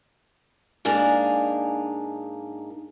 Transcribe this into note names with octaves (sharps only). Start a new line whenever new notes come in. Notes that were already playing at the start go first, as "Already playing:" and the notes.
G#2 A#3 D4 D#4 G#4 A#4